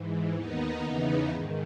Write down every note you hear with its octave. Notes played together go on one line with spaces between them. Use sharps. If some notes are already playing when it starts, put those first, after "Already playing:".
Already playing: G#2 E3
D#2 D#3 B3 D#4
E2 C#3 E3 B3 D#4
G#2 D#3